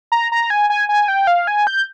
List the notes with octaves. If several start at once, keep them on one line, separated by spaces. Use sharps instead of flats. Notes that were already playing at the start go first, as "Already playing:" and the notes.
A#5
A#5
G#5
G#5
G#5
G5
F5
G#5
G6